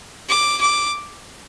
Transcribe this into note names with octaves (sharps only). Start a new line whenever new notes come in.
D6
D6